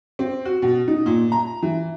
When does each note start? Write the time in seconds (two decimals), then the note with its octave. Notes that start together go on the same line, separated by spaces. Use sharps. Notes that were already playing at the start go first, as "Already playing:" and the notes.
0.19 C4
0.45 F#4
0.62 B2
0.88 D#4
1.06 A#2
1.32 A#5
1.62 E3